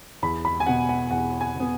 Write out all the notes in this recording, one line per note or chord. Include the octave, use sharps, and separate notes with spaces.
E2 B5
B5
G#5
B2 B3 F#5
F#5
E2 F#5
G#5
B2 B3